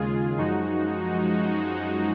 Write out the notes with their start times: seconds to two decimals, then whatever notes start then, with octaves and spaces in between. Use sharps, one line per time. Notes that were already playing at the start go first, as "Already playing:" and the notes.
Already playing: D#2 C#3 G#3 F4 G#4
0.38 F#2 F3 G#3 D#4 F#4